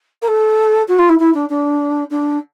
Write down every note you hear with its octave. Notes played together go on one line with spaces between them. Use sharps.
A#4
A4
F#4
F4
E4
E4
D4
D4
D4